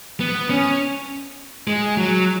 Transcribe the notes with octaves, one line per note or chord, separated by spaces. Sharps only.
B3
C#4
G#3
F#3